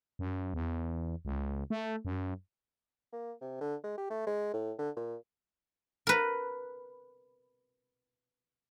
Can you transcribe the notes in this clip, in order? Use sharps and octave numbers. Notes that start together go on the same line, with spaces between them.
F#2
E2
C#2
A3
F#2
A#3
C3
D3
G#3
G4
A3
G#3
A2
D3
A#2
A#4 B4